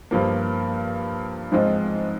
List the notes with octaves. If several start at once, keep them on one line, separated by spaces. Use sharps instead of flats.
G2 F3 A#3
G#2 F3 G#3 C4 F4